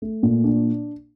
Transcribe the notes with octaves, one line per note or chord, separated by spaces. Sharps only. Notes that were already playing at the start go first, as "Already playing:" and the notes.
A3
A#2
D4